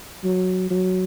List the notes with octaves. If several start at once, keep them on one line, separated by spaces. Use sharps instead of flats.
F#3
F#3